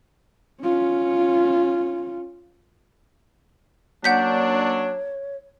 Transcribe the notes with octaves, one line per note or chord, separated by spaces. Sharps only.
C#4 F4
F#3 A#3 C#4 D4 C#5 F#5 G6 B6